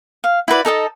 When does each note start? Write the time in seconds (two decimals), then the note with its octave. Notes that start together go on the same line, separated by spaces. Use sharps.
0.24 F5
0.48 E4 F#4 B4 D5
0.65 D#4 A4 D#5 A5